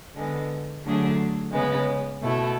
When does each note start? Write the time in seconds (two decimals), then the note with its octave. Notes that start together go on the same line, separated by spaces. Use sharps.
0.15 D3 G#3 B3
0.85 D3 F#3 A3 D4 G#4
1.52 C#3 G#3 B3
2.21 B2 A3 E4